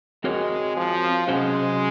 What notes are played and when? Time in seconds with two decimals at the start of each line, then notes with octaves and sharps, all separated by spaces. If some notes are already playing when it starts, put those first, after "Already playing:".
0.24 G#3 C4 F#4 A#4 C#5
0.77 F3
1.27 C3 F#3 G#3 C#4 F#4 C5